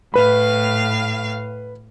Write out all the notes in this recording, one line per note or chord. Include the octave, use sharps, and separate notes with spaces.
A2 B4 F5 B5